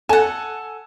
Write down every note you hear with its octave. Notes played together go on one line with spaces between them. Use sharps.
A4 F#5 G#5